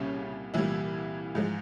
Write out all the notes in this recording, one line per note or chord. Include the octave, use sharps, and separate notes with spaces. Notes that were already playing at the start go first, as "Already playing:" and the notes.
Already playing: C2 A#2 C#3 G3 C#4
C2 A#2 E3 G3 E4
G#2 F3 G#3